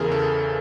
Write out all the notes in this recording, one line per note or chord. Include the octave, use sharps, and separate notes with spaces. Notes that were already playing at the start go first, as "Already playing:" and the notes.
Already playing: E2 C#3 E3 G#4 A#4
A4